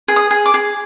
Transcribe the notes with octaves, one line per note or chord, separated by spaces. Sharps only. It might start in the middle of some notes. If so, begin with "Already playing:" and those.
G#4
D#6
G#4
D6
G#4